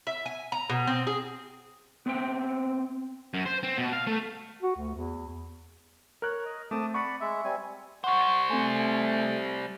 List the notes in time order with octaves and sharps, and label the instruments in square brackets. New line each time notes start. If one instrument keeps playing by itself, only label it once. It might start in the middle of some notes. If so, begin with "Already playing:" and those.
[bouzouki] E5
G#5
A#5
B2
C4
G#4
[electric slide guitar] B3 C4 C5 E5 G5
[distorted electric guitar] F#2
C5
C4
B2
F5
A3
[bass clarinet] F#4
D2
E2
[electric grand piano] A#4 F#6 [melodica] C#5
[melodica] D#5
[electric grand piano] A3 C4 [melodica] A5 D6 D#6
[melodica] D5 F#5 B5 [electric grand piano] C#6
[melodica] G#3 E5
G3 C4 G#5
[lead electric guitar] G3 C5 [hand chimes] F#5 C#6
[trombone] A3 [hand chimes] C4 G#5